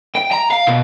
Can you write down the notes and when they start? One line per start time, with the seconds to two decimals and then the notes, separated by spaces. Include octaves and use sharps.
0.15 G5
0.32 A#5
0.51 F5
0.67 B2